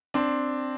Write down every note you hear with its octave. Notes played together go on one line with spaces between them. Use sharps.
C4 D4